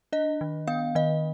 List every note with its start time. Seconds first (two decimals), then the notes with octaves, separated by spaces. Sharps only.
0.13 D4 D#5
0.41 D#3
0.67 B3 F5
0.95 D#3 D#5